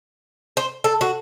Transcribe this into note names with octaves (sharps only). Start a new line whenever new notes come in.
C5
A4
F#4